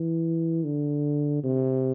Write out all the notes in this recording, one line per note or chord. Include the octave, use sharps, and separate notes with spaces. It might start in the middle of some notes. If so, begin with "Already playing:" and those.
Already playing: E3
D3
C3